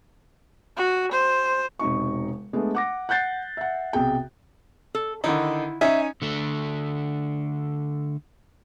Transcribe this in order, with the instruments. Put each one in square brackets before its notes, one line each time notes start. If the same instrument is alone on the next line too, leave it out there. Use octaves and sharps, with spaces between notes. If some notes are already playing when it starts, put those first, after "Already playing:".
[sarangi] F#4
C5
[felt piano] E1 C3 D#4 C#6
G#3 A3 B3 D4
F#5 D6 A#6
F#5 F#6 G6 A6 C7
E5 F#5
B1 C3 G#4 G5
[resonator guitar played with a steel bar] A4
[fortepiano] D3 D#3 D#4 [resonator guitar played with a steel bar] E4
[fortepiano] C#4 D#4 G#5 [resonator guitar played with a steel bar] E5
[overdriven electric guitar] D3 A3